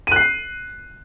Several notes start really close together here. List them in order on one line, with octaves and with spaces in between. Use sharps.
D#7 F#6 C7